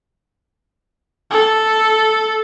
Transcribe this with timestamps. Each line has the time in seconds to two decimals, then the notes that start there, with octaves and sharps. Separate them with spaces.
1.31 A4